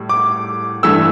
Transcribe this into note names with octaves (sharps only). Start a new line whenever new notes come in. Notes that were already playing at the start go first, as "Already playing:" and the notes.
Already playing: A2 G3
D6
G2 E3 A3 E6